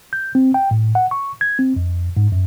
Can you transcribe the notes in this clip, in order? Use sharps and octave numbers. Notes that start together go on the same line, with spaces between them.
G6
C4
G5
A2
F#5
C#6
G#6
C4
F2
G#2
F#2